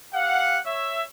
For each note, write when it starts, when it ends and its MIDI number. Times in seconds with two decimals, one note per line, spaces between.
0.14 0.57 67
0.14 0.57 77
0.14 0.57 78
0.66 1.03 73
0.66 1.03 76